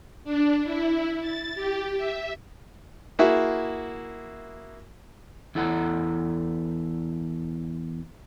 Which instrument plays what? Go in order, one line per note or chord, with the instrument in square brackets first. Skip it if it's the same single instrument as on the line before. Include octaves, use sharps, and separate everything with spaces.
[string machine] D4
E4
A6
G4
E5
[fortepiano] A#3 E4 F#4 G#4 E5
[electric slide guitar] E2 E4 A4 F#5 A#5